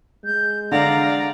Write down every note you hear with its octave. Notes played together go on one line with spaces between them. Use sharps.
G#3 G6
D3 D5 F5 A#5